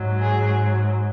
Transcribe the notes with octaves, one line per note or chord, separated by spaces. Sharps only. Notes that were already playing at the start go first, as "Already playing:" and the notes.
Already playing: G#2 F#3
G#4